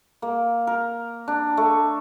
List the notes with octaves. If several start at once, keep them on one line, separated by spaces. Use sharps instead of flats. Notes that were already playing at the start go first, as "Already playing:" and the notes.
A#3
A#4
D4
A3